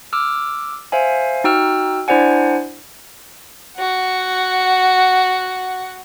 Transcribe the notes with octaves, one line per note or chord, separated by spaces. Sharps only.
D6 E6 F6
C5 E5 F5 G#5
D#4 F#4 G5 E6 F6
D4 E4 C5 D5 F#5 G#5
F#4 F#5